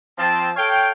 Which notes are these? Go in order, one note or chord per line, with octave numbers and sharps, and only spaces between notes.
F3 C4 A5
A4 C#5 F5 G5